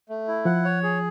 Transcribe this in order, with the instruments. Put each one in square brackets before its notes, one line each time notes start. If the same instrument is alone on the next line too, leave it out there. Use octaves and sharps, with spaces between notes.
[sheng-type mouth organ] A3
E4
[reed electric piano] F3 [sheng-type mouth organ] F#5
[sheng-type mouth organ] C#5
G#4